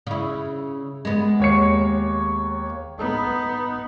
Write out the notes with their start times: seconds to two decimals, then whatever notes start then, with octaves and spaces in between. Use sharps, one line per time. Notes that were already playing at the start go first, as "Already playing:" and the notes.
0.07 C#3 E4
1.05 G#3 B3
1.40 D#2 C#5 C#7
2.98 B3 D#4